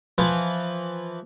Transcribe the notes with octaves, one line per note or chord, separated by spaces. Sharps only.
E3 F3